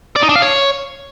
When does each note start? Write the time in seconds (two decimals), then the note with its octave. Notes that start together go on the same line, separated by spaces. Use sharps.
0.16 D5
0.23 D#4
0.29 D4
0.36 F5
0.42 C#5